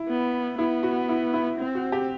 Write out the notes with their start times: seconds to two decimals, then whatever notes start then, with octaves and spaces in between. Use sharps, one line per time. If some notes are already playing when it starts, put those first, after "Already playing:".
Already playing: E4
0.09 B3
0.58 B3 E4
0.83 F#4
1.09 E4
1.34 E4
1.59 C4
1.75 F#4
1.92 G4